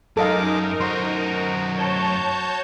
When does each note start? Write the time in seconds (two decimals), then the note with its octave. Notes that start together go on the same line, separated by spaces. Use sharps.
0.17 F#2 G#3 D#4 A4 A#4 D#5 F5 D6
0.80 F#2 F#4 C5 C6
1.76 C#5 A5 G6